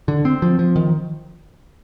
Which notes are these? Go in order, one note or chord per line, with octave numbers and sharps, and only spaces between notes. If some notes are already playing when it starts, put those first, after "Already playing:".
D3
C4
F3
F3
D#3